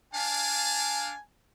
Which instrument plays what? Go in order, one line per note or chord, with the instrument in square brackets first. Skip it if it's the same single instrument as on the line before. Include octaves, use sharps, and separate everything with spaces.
[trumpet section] D4 F5 [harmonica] G#5 A5